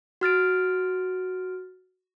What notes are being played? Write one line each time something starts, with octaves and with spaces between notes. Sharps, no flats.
F#4 F6 A6 D7